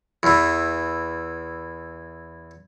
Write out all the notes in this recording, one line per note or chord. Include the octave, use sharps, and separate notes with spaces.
E2 E3